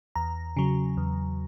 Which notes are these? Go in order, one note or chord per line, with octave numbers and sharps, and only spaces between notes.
E2 A#5
C#3 F#3
E2